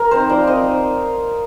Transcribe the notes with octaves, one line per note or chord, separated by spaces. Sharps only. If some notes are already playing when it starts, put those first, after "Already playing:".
Already playing: A#4
C4 D#4 C5
F3 D5
C4 D#4 D#5